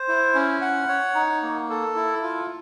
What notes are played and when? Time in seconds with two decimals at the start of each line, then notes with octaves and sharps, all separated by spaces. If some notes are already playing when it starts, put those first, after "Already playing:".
Already playing: C5
0.08 E4
0.34 C#4
0.61 F#5
0.88 C#5
1.15 D#4
1.42 A#3
1.70 A4
1.96 E4
2.22 F4